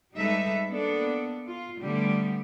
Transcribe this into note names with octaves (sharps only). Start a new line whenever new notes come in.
G3 G#3 D#4 A4 B4 E5
A#3 B3 D4 A4
F4
D3 G3 A3 B3 G4